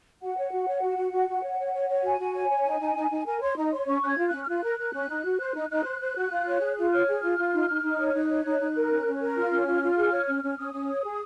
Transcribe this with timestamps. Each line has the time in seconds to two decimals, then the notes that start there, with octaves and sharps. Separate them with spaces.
0.21 F#4 F#5
0.37 C#5
0.52 F#4
0.67 C#5
0.82 F#4
0.97 F#4
1.13 F#4
1.29 F#4
1.44 C#5
1.58 C#5
1.74 C#5
1.89 C#5
2.04 F#4 G#5
2.20 F#4
2.35 C#5
2.50 C#5
2.65 D#4
2.81 D#4
2.96 D#4
3.11 D#4
3.26 A#4 G#5
3.41 C#5 C6
3.57 D#4 A#5
3.72 C#5 C6
3.87 C#4 C#6
4.02 C#4 F#6
4.08 G#6
4.18 F4
4.28 F#6
4.33 C#4
4.43 F6
4.48 F4 F#6
4.63 A#4
4.79 A#4
4.94 C#4
5.10 D#4
5.25 F#4
5.40 C5
5.55 D#4
5.70 D#4 F#6
5.85 C5
6.00 C5
6.17 F#4
6.31 F4
6.47 C#5
6.61 G#4
6.77 F4
6.92 C#5 F6
7.07 G#4
7.23 F4
7.38 F4
7.53 D#4
7.69 D#4
7.83 D#4
7.99 C#5
8.09 F6
8.14 D#4 F#6
8.29 C#5
8.45 D#4
8.60 D#4
8.75 A#4
8.90 C#4
9.06 C#4
9.21 A#4
9.36 F4 F6
9.52 C#4
9.66 F4
9.82 F4
9.97 G#4
10.12 C#5
10.28 C#4
10.43 C#4
10.58 C#4 D#6
10.74 C#4
10.89 C#5
11.04 G#4